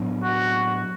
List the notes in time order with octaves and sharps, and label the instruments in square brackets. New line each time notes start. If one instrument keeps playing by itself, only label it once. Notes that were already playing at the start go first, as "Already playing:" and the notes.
Already playing: [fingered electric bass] A2 F#3 B3 D4
[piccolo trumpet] F#4